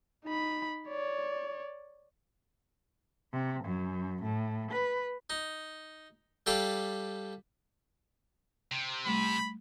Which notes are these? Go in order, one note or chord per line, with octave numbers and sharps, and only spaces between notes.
D#4 B5
C#5 D5
C3
F#2
A2
B4
D#4
G3 A4 F5 G5 B5 D6
C3
G3 A3 B5 C6